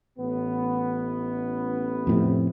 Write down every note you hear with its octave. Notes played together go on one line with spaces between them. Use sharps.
A1 B3
F2 A2 C3